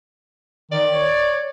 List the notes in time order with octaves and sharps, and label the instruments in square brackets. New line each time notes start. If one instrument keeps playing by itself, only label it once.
[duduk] D#3 [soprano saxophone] D5
[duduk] C#5